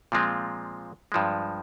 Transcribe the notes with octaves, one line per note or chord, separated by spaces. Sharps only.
A#2 F3 G#3 C4 F4
G2 F3 G#3